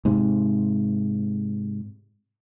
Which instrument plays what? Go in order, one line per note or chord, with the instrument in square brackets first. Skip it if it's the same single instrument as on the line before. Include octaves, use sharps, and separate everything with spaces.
[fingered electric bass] G#2 C3